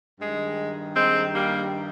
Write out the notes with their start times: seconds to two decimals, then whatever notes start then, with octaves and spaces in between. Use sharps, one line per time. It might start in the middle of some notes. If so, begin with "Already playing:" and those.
0.19 G2 D#3 G#3
0.96 G#3 C4
1.34 G3 A#3